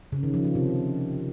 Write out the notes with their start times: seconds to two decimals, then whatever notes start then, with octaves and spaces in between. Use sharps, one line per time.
0.12 C#3
0.23 D#3
0.34 F3
0.45 F3
0.55 C3